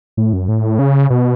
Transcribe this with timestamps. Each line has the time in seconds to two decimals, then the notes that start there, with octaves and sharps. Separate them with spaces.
0.17 A2
0.33 F#2
0.48 A2
0.79 C#3
1.10 B2